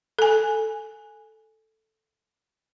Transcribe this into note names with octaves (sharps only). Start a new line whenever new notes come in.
A4 G#5